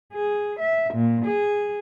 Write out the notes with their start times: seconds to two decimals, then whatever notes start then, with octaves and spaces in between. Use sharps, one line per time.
0.13 G#4
0.60 E5
0.94 A#2
1.25 G#4